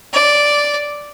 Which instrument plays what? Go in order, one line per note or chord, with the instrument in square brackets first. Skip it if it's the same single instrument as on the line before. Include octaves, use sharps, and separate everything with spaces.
[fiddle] D5